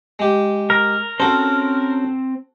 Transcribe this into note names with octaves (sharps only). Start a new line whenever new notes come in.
G#3 G4
A#4
C4 C#4 F#4 A4 C5